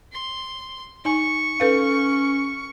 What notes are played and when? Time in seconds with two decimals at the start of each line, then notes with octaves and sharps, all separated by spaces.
0.12 C6
1.05 D#4 G#5 C#6
1.60 C#4 A4 B4 F5